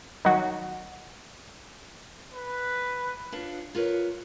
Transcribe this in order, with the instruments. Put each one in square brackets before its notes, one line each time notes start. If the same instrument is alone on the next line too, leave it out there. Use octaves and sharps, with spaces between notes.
[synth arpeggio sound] D#3 F#3
[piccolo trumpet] B4
[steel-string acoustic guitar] D4 F4 B4 C#5
F4 A#4 B4 C#5